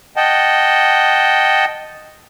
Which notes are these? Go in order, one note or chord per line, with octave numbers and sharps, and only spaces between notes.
D#5 F#5 G5 A5